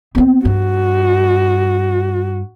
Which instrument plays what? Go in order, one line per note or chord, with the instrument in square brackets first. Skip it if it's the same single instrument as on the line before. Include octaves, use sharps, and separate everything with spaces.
[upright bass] B3 C4
[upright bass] G2 [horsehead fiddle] F#4